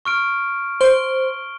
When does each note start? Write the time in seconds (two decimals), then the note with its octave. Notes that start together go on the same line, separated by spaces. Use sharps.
0.05 C#6 F6 D7
0.81 C5 D7 G7